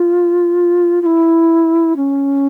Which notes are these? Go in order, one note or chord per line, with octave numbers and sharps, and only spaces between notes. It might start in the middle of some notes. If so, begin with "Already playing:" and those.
Already playing: F4
F4
E4
C#4